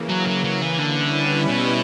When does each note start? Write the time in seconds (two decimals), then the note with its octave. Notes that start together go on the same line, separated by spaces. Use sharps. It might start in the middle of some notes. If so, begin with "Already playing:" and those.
Already playing: C#3 E3 A#3
0.09 F#3
0.27 F#3
0.44 F#3
0.61 E3
0.78 D3 G3 C#4 E4 B4
1.48 B2